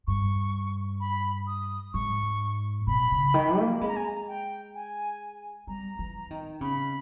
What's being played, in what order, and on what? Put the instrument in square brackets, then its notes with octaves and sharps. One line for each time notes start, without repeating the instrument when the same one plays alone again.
[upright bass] G2 [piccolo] C#6
[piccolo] B5
D#6
[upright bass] G#2 [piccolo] C#6
[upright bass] B2 [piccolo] B5
[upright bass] C#3
D#3
A#3
[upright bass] G#3 [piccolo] B5
[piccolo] A#5
G#5
A#5
G5
G#5
[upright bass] G3 [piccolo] A#5
[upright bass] E3
D#3
[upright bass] C#3 [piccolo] B5